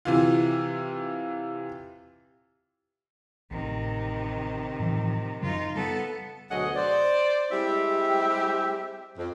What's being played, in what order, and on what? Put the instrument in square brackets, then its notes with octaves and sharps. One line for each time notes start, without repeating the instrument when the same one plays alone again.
[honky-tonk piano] C3 E3 F4
[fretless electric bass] A1 [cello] C3 D#3
[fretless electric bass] A2 E3 F3
[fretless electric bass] F#2 C#3 F#3 [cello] D#4 F4
[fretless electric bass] G3 [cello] B3 A4
[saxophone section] D2 B2 F#3 G#4 D#5 F#5
C5 D5
G3 G#3 C4 E4 G4 E5
F2